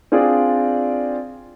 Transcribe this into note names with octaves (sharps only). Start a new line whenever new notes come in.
C4 D4 F4 G#4 D5